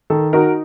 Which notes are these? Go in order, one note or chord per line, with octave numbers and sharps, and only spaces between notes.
D#3 A4
D#4 F#4 A#4